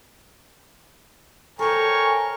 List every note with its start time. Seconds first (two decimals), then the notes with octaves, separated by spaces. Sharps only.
1.59 A4 A#4 C5 C#5 G5 G#5